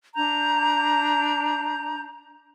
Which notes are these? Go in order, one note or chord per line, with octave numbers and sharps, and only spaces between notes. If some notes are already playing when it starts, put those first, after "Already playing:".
D4 A#5 G6